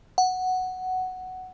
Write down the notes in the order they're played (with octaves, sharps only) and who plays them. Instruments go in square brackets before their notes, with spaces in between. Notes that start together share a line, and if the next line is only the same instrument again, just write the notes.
[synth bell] F#5